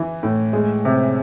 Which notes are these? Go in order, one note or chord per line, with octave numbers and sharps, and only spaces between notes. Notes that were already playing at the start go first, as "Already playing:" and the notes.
Already playing: E3
A2
G#3
C3